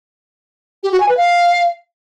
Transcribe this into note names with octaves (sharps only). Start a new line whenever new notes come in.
G4
F#4
G#5
B4
F5